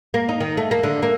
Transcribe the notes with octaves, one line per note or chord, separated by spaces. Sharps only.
A#3
D#4
D#3
A3
A#3
D3
A#3